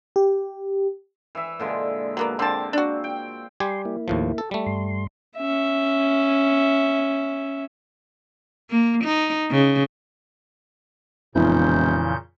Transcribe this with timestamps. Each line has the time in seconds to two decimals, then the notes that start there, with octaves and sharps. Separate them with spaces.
0.16 G4
1.35 E3 E5
1.59 A#2 D3 G#3
2.17 F#3 A#3 B3
2.39 A#2 D3 C4 A5
2.73 D4 F#4
3.04 G5
3.60 G3 G4 G#5 C6
3.85 A#3 E4
4.08 D#2 A2 F3
4.38 A4
4.51 G3 A3
4.66 G2 C6
5.37 C#4 E5
8.70 A#3
9.04 D#4
9.51 C#3
11.35 E1 F2 A#2 C#3 E3 E4 G6